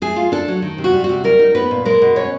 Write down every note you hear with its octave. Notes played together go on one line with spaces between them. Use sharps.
A3 G#4
F4
D4 A4
F#3
D#3
C3
F#4
G3
F#4
C3
G3 A#4
D#4
B3 B4
A#2
G#3 A#4
B2
C#4 C#5